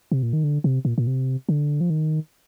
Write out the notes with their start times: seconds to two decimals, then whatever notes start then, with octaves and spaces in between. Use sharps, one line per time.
0.12 C3
0.23 A#2
0.33 D#3
0.44 D3
0.64 C3
0.85 A#2
0.98 A#2
1.07 C3
1.49 D3
1.81 F3
1.90 D#3